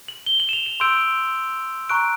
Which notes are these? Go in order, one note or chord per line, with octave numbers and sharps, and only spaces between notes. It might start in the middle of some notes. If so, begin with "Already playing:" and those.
F#7
G7
F#7
E7
F7
E7
C6 E6 G6 D7
A#5 C#6 F#6 D7